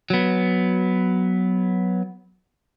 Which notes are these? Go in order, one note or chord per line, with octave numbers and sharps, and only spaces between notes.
F#3 B3